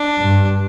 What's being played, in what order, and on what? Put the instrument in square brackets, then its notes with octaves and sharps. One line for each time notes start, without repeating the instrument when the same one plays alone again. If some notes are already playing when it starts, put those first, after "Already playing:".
Already playing: [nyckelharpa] D4
[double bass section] G2